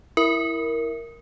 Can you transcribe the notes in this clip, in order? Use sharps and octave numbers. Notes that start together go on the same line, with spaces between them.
E4 A#4